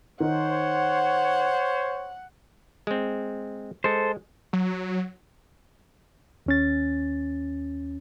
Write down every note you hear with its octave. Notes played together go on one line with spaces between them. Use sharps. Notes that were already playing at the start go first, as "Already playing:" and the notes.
D#3 C5 C#5 F#5
G#3 C4
G#3 A4 C5
F#3
D#2 C#4 A6